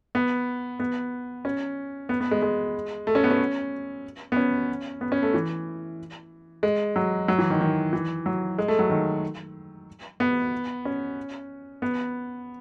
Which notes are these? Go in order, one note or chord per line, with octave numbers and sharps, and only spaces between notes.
B3
B3
C#4
B3
B3
G#3
G#3
A3
C#4
B3
C#4
B3
C#4
B3
C#4
A3
E3
G#3
F#3
F#3
E3
D#3
D#3
E3
F#3
G#3
A3
F#3
D#3
B3
C#4
B3